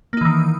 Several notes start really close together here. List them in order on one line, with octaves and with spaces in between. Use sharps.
A#3 D#4 E3 D#3